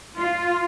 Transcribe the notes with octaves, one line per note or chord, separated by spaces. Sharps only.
F4